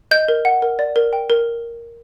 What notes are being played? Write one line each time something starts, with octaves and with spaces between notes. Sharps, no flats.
D#5 G6
A#4
F#5
A#4
D5
A#4
G5
A#4